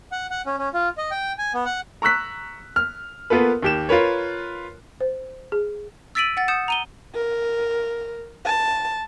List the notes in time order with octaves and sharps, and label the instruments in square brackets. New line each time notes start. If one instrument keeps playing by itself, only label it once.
[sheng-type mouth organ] F#5
F#5
C#4
C#4
F4
D#5
G5
G#5
B3
F#5
[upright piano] A#5 C#6 E6 F#6 B6
F6
A#3 B3 F4 A4 B4
D#2 G4 E7
F4 A#4 B4 C#5
[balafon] C5
G#4
[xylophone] E6 A6 B6 D7 D#7 F#7
F#5 A6
D#6 G6 C#7 E7
A#5 D#7 G7
[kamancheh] A#4
A5